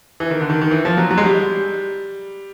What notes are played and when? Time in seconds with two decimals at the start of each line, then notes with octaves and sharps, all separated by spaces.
0.20 E3
0.31 D#3
0.41 D3
0.50 D#3
0.61 D#3
0.71 E3
0.85 F3
0.97 F#3
1.10 F#3
1.18 G#3
1.23 G3